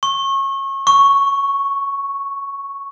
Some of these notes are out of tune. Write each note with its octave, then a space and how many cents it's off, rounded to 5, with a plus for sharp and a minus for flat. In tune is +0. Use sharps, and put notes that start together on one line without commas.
C#6 -30
C#6 +0